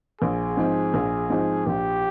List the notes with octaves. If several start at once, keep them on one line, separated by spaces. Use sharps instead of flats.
A#1 G#4
G#2 F3 C4
A#1
G#2 F3 C4
A#1 G4